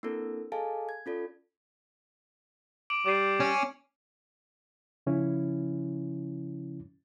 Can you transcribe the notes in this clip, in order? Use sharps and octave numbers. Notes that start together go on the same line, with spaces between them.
A#3 C4 D4 E4 A4 A#4
G#4 A4 D#5 F5 G#5 A5
G#6
C#4 F4 A4 D5
D6 D7 F#7
G3 D6 C7
C#4
C#3 F3 C#4 E4